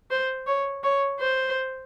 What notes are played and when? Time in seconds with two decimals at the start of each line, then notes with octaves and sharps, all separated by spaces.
0.11 C5
0.47 C#5
0.83 C#5
1.20 C5